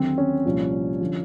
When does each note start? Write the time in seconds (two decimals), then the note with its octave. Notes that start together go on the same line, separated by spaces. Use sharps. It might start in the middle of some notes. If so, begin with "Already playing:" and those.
Already playing: D#2 D3 F#3 C4
0.18 C#4
0.46 C2 A#2 F3
1.01 D3 F3